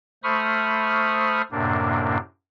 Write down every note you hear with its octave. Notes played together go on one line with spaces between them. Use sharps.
A3 C5 B5 C#6 D#6 F6
F#2 A2 C3 A#3 D4